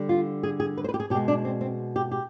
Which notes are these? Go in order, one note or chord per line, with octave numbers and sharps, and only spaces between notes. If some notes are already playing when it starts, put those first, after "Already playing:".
Already playing: D3 G3
F4
G#4
G#4
B4
C5
B4
G4
G#4
B2 G#3 G4
D4
C4
C4
G4
G4